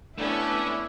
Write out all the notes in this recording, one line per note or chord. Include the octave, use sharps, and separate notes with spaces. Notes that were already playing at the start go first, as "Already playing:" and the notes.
A3 B3 C#4 D4 E4